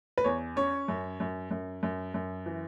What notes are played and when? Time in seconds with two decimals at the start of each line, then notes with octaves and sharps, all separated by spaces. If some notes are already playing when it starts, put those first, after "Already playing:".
0.18 B4
0.24 E2 C#5
0.56 C#4 C#5
0.88 F#2
1.20 F#2
1.51 F#2
1.83 F#2
2.14 F#2
2.46 E3